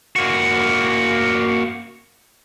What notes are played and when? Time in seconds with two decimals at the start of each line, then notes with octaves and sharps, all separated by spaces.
0.16 A#3 F#4